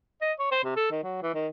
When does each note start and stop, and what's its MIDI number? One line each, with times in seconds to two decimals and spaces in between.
0.21 0.32 75
0.39 0.47 73
0.52 0.63 72
0.64 0.74 48
0.76 0.87 69
0.91 0.99 51
1.04 1.21 54
1.23 1.33 52
1.34 1.48 51